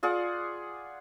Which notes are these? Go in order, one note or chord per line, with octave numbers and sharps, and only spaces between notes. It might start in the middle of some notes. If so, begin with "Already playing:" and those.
F4 G#4 D5 F#5